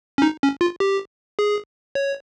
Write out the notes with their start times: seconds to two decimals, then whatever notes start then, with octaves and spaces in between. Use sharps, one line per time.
0.18 C#4
0.22 D#4
0.42 C#4
0.61 F4
0.80 G4
1.39 G#4
1.95 C#5